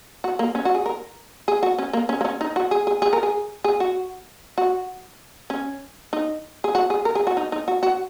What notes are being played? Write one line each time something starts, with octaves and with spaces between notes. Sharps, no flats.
F#4
A#3
C#4
F#4
G#4
A#4
G#4
F#4
C#4
A#3
C#4
A#3
C#4
D#4
F#4
G#4
G#4
G#4
A#4
G#4
G#4
F#4
F#4
C#4
D#4
G#4
F#4
G#4
A#4
G#4
F#4
D#4
D#4
F#4
F#4